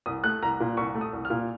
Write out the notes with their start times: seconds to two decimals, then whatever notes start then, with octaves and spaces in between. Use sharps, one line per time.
0.06 C2 D#6
0.24 A3 F#6
0.43 C2 A#5
0.60 A#2
0.77 C2 C#6
0.95 A3
1.01 D#6
1.13 C2
1.25 F6
1.30 A#2